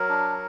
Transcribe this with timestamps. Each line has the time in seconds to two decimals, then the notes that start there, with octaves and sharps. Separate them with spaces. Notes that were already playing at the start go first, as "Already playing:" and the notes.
Already playing: F#3 A#4
0.09 D4